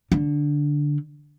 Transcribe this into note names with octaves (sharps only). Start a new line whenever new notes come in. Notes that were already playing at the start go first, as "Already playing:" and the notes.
D3